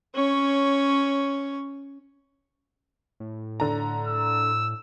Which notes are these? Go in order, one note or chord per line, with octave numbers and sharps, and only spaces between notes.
C#4 C#5
A2
D3 A#5
E6